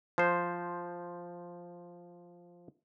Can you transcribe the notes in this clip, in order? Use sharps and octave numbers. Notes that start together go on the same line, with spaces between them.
F3 C5